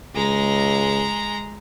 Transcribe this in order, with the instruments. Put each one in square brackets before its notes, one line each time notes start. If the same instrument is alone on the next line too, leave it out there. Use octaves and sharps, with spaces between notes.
[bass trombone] C#2 [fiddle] G#3 A#5